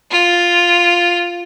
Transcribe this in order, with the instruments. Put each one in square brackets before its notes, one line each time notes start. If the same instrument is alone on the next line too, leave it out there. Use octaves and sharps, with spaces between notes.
[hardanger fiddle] F4